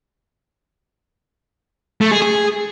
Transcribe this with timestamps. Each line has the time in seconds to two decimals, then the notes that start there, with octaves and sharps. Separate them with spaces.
2.01 A3
2.11 G#4
2.22 G#4